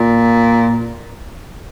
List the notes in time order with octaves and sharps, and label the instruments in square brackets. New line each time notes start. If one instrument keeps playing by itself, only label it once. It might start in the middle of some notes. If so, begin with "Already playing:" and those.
Already playing: [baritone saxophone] A#2